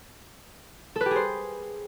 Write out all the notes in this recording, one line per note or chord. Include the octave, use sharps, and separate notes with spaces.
A4
B4
G4
G#4
C5